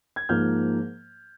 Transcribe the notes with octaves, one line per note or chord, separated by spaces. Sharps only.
G#6
G#2 F3 A#3 F6 G6